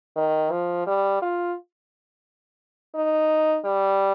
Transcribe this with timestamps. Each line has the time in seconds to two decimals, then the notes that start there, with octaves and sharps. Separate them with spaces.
0.16 D#3
0.51 F3
0.87 G3
1.22 F4
2.95 D#4
3.65 G3